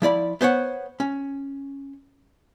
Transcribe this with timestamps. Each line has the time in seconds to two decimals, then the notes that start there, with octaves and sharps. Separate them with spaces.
0.02 F3 E4 D5 B5
0.41 B3 C5 C#5 F#5
1.00 C#4